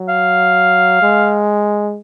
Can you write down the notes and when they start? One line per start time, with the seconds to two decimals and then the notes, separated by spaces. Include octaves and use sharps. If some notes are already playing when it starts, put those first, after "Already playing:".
Already playing: F#3
0.09 F5
1.02 G#3